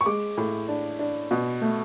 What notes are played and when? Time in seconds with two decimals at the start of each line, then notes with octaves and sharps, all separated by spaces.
0.01 C#6
0.06 G#3 D6
0.37 A2
0.69 D4
0.99 D4
1.31 B2
1.61 A3